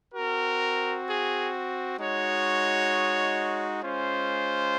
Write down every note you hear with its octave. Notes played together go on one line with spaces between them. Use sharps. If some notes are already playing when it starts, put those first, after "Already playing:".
C4 F#4 A#4
G#4
G#3 D#4 F#4 C#5
G#3 C#4 F4 C5